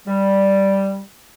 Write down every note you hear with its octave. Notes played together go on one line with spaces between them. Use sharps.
G3